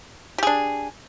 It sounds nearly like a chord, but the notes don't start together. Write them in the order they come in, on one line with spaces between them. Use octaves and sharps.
G4 G#4 D4